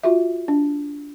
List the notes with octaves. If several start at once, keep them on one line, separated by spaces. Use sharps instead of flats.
F4 F#4 E5
D4